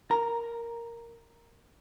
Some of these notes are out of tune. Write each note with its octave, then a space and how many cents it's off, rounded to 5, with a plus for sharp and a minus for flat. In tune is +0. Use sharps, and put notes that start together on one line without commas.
A#4 +0 A#5 +0